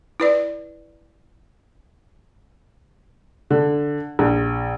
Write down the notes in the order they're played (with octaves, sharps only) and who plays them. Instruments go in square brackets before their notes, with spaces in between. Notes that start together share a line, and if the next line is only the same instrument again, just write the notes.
[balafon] E4 B4 D5
[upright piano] D3
A#1